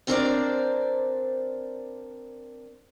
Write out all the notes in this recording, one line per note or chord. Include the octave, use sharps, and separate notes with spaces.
B3 C4 D4 A#4 C5 D5